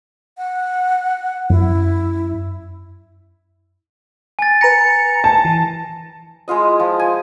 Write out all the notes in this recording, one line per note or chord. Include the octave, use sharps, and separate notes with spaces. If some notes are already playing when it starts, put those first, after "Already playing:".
F#5
F#2 E4
G#5 A6
B4 A#5 A#6 C#7
A5
E3
G#3 E4 F4 D#5
F3
G#5